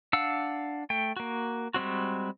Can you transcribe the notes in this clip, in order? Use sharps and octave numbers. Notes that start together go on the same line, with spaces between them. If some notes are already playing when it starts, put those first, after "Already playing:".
D4 F5 F#5 E6
A3 G5
A#3 F#4
G3 G#3 C4 F#4